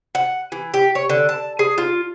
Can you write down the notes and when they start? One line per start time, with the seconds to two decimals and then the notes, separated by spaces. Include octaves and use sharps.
0.15 F#5
0.52 E3
0.74 G4
0.95 C#5
1.09 D3
1.29 A5
1.59 G#4
1.78 F4